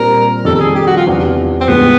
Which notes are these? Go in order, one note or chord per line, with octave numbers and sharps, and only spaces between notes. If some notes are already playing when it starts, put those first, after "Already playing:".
Already playing: A#2 G3 C4 A#4
F2 C3 D#3 G3 A4
A4
G#4
G4
F#4
F4
E2 C3 F3
C4
A2 F3 G#3 B3